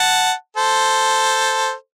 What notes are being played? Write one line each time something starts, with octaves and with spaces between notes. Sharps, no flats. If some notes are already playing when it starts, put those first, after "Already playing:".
Already playing: F#5 A5
A4 C5